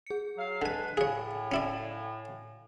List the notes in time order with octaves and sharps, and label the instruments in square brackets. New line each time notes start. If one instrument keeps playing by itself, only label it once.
[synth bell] G#4 C#7
[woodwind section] F#3 F5
[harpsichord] D3 G#5 [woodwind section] G#3 D4 B4
[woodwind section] A2 [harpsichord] G#4 C#5 [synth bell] F5 G#5
[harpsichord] C#4 E4 D5